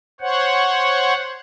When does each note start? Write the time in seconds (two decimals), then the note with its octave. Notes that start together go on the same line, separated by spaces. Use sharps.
0.21 C5 C#5 F#5